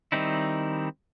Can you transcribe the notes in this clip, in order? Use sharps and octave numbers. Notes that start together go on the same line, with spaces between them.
D#3 G3 C4 D#4 E4